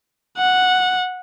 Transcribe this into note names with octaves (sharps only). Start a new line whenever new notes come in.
F#5